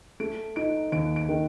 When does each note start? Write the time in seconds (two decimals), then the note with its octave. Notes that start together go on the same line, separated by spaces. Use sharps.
0.20 A3 D7
0.56 D#4 D7
0.92 D#2 D7
1.16 D7
1.29 D#3